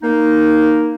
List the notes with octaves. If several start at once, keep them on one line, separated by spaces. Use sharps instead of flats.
A#3 D#4